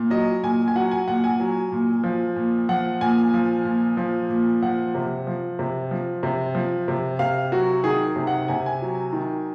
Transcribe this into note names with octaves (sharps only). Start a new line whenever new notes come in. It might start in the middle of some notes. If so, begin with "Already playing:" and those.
Already playing: A#2
F#3 D#5
A#2 G#5
G#5
F#3 F#5
G#5
A#2 F#5
G#5
F#3
A#2
F3
A#2
F3 F#5
A#2 G#5
F3
A#2
F3
A#2
F3 F#5
C3
F3
C3
F3
C3
F3
C3
C3 F5
F#3 F#4
D#3 G#4
C3
F#5
C3 G#5
G#5
F#3
D#3